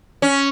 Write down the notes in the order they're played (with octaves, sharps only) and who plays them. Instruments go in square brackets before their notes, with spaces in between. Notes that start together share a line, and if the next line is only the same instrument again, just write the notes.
[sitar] C#4